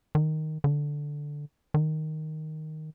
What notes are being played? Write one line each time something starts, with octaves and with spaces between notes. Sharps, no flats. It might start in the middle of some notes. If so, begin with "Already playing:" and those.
D#3
D3
D#3